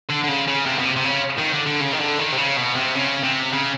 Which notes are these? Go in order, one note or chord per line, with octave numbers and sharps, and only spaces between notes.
D3
D3
C#3
C#3
C3
B2
C3
C3
C#3
D#3
D3
D3
C#3
D#3
D3
D#3
C3
C#3
B2
C3
C#3
C3
C#3